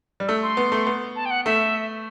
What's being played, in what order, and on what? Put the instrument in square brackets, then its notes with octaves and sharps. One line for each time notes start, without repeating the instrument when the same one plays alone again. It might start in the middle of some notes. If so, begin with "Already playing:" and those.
[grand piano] G3
[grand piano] A3 [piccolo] E6
[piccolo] C6
[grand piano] B3
A3
B3
[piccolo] A5
G5
F#5
[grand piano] A3 [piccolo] E5